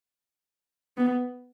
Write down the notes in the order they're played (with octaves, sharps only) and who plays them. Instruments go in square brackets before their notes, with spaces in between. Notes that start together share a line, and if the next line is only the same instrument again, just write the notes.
[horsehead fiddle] B3